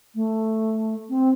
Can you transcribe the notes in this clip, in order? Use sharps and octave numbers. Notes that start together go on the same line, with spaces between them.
A3
C4